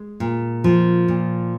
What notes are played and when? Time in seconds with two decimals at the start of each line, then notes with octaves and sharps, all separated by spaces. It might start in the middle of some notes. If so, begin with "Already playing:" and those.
Already playing: G#3
0.20 A#2
0.64 F3
1.08 A#2